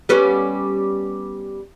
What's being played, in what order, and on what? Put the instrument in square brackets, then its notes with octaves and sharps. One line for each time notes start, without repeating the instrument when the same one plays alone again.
[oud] G3 B3 C#4